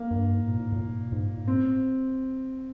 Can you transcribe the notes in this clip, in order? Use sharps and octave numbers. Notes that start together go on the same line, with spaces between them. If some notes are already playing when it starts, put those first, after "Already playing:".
Already playing: A#3
G2
G#2
A#2
G#2
A#2
G#2
A#2
G#2
A#2
G#2
C4